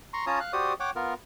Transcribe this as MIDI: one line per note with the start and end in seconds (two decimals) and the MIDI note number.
0.13 0.26 82
0.13 0.26 84
0.13 0.26 85
0.27 0.39 61
0.27 0.39 65
0.27 0.39 73
0.27 0.39 81
0.27 0.39 82
0.27 0.39 87
0.40 0.52 77
0.40 0.52 90
0.53 0.73 66
0.53 0.73 67
0.53 0.73 72
0.53 0.73 74
0.53 0.73 87
0.80 0.91 73
0.80 0.91 78
0.80 0.91 79
0.80 0.91 86
0.96 1.14 59
0.96 1.14 65
0.96 1.14 70